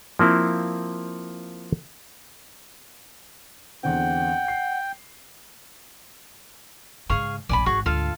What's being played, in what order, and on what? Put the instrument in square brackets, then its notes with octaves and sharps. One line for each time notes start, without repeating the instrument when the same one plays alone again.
[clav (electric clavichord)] F3 A#3 C4 E4
[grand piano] E2 D3 C4 [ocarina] F#5 [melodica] G5
[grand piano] C7
[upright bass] G#2 C#3 [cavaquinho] G#4 F5 C#6
[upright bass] D1 A#1 [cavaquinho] D5 G#5 B5
[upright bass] G#1 [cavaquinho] F#4 G#4 C#6
[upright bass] D2 G#2 [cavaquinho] F4 A4 F5